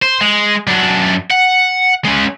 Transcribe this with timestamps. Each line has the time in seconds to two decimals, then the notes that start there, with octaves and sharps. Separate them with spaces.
0.03 C5
0.21 G#3
0.67 F#2 D4
1.30 F#5
2.05 G#3 C#4